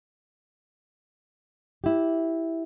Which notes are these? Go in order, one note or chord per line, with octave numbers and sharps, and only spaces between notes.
E4 G4